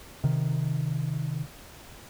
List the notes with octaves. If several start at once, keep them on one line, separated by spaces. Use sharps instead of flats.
C3 D#3